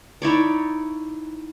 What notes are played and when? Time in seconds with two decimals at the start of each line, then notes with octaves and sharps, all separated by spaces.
0.22 D#4 E4 C#5 D5